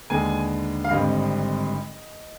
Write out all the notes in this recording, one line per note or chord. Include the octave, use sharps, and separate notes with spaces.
D#2 D3 G#3 B3 D4 G#5
F5
G#1 G2 D3 G3 C4 D#5